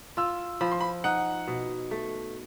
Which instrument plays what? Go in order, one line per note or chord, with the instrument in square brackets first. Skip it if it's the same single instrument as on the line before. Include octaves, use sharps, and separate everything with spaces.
[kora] F4 [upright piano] E6
[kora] F3 [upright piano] B5
[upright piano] C6
B5
[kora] D#4 [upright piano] F#5
[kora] B2
A3